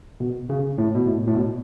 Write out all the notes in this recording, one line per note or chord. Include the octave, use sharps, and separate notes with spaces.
B2
C#3
A2
B2
A2
A2
B2